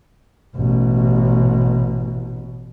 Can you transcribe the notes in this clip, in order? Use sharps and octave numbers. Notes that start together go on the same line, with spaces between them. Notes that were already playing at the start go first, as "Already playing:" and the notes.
A1 B2